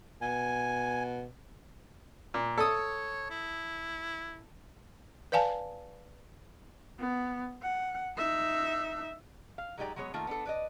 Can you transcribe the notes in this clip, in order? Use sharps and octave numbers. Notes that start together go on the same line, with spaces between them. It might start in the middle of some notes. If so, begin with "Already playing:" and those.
B2 G#5
A#2
A4 C#5 D#6
E4
B4 D5 F5 G#5 A5
B3
F#5
D#4 E5
F5
F#3 G#3 D#4 G4 D5 A#5
F#3 G#3 B3 G#4 C#5
D#3 A3 A#3 F4 A#5
B3 D4 A4
B4 D5 D#5